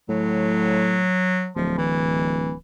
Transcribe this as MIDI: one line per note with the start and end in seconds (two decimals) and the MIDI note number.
0.09 1.12 45
0.09 1.50 54
1.56 2.55 26
1.56 1.77 53
1.78 2.54 52